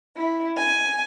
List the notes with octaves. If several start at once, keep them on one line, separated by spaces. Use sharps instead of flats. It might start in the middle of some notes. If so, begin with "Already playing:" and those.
E4
G#5